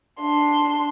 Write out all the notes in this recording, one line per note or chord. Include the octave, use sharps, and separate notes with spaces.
D4 C6